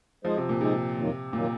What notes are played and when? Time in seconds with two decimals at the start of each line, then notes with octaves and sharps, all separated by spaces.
0.24 F3 G#3 D#4 G#4 C5
0.37 C3
0.49 A#2
0.61 C3 G#3 D#4 G#4 C5
0.98 F2 D#3 F#3 A#3 F4
1.33 A#2 D#3 F#3 A#3 F4